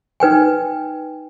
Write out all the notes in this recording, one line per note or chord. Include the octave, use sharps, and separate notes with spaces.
D#4 B4 G5 G#5